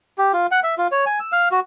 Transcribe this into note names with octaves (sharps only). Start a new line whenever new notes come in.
G4
F4
F#5
E5
F4
C#5
G#5
E6
F5
F#4